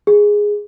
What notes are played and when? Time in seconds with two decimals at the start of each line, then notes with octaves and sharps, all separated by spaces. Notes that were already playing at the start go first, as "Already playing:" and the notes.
0.07 G#4